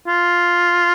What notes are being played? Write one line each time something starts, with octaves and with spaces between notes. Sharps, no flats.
F4